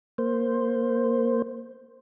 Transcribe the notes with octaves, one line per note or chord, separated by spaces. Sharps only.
A#3 C5